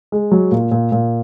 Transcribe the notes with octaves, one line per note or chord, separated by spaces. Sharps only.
G#3
F#3
A#2
A#2
A#2